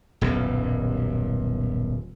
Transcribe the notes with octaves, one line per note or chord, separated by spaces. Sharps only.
D#1 B1 F#2